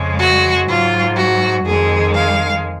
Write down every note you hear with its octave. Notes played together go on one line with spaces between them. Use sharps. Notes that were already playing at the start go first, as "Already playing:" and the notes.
Already playing: F2 C#3 G#3
F#4
G#2 F#3 F4
F#4
F2 D#3 G#3 G#4
F5